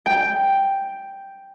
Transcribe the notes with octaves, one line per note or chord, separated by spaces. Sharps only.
G5